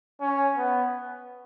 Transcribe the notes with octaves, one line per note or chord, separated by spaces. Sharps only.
C#4
B3